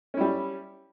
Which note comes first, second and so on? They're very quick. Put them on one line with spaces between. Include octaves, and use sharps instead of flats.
C#4 E4 G3